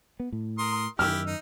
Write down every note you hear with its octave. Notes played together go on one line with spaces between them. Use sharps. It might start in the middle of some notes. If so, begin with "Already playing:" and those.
B3
A2
A#4 C6 D#6
F#2 D#3 E4 G4 E6 F6
D#4